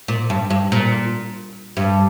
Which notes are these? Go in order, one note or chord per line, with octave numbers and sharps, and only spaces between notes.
A#2
G2
G2
A#2
G2